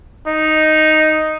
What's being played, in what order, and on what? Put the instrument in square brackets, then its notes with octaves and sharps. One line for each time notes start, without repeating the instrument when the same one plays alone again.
[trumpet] D#4